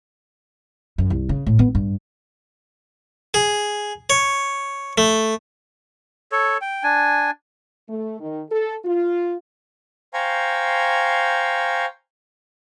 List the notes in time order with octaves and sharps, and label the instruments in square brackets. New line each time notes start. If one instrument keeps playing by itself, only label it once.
[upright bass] F#2
C2
C#3
A2
B3
G2
[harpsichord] G#4
C#5
A3
[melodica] A4 C#5
G5
D4 G#5
[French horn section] A3
D#3
A4
F4
[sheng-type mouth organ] C5 F5 G5 G#5 A#5 C#6